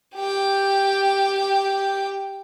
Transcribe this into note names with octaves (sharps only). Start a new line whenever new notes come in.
G4 G5